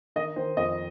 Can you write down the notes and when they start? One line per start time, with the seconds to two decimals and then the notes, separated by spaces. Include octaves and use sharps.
0.16 D#3 D#5
0.36 D#3 C5
0.57 F2 D#5